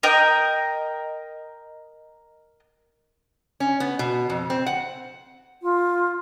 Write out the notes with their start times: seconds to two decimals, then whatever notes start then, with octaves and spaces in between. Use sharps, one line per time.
0.03 A#4 D#5 G5
3.60 C#4
3.80 B3
3.99 B2
4.30 F2
4.50 C4
4.66 F#5
5.62 F4